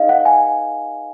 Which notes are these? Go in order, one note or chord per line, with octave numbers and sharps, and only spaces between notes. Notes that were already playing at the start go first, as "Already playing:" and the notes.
Already playing: D#4 G#4 B4 D#5 F5
F#5
G#5